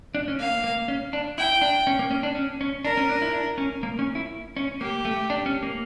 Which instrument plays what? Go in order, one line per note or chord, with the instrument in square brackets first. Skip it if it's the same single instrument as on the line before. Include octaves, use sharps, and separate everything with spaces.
[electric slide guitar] D4
C#4
[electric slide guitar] A#3 [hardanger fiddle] F5
[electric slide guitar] A#3
C#4
D4
[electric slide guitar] E4 [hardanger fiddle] G5
[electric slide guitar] D4
C#4
A#3
C#4
D4
C#4
C#4
[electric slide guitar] D4 [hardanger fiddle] A#4
[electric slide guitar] C#4
D4
E4
D4
C#4
A#3
C#4
E4
C#4
[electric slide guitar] A#3 [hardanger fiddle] G4
[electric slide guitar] A3
D4
C#4
A#3